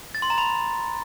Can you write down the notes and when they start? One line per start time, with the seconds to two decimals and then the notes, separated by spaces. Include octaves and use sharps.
0.15 A6
0.22 C6
0.30 A#5
0.38 B5